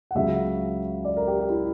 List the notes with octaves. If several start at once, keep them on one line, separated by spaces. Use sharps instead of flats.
F#5
C#2 C#3 F#3 E5
D5
A#4
G4
G4
E4